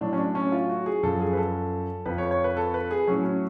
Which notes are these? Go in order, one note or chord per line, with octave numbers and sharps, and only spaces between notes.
A2 F#3 D4
C#4
D4
C#4
F4
F#4
G#4
F#2 F3 A4
G#4
B4
A4
F2 F3 B4
C#5
C#5
B4
A4
B4
G#4
A2 F#3 C#4
C#4